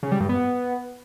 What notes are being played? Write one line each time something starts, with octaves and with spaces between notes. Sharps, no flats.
C#3
G3
G2
B3